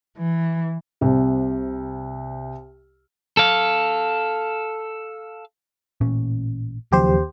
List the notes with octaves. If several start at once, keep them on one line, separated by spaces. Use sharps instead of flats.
E3
C2 C3
A4 F5
A1 A#2 C#4
D#2 C#3 F3 F#3 G4 C5